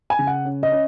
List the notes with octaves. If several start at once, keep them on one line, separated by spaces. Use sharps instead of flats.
G#5
C#3
F#5
C#4
D#5
C#4